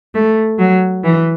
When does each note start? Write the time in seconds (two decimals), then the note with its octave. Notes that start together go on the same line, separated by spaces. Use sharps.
0.15 A3
0.59 F#3
1.04 E3